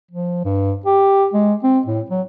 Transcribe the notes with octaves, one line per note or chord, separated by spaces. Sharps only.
F3
G2
G4
G#3
C4
A2
F#3